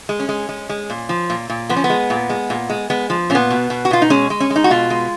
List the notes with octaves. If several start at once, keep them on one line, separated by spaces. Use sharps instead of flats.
G#3
C#4
G#3
G#3
G#3
A#2
F3
A#2
A#2
F3 B3
C#4
B3
G#3
A#2
G#3
A#2
G#3
G#3 B3
F3
A#2 C#4
B3
B2
B2
F#4
B2 F4
D#4
G#3 C#4
G#3
C#4
G#3
D#4
F#4
B2 F4
G#3